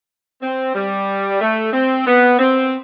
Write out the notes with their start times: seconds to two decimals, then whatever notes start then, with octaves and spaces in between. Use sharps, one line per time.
0.42 C4
0.75 G3
1.40 A3
1.73 C4
2.06 B3
2.39 C4